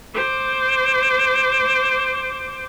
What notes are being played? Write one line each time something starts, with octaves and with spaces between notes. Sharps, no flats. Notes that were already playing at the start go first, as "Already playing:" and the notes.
C5 D6